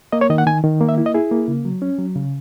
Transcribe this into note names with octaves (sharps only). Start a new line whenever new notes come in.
A#3 D#5
C#5
D#3 D#5
F#5
D#3 G#5
D#3
A#3
E5
E4
D#5
E4 G#4
A#3
C#3
F#3
C#4
F#3
C#3